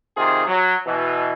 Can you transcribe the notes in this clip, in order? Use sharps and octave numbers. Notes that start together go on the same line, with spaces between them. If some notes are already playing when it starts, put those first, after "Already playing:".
C3 D#3 F4 G#4
F#3
B2 E3